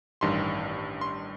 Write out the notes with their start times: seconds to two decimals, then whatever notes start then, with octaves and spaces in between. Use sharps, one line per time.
0.21 A1 G2 D#3 C6
1.01 C6